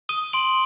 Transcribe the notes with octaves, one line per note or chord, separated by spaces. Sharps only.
D#6 D#7 G7
C6 D7 F#7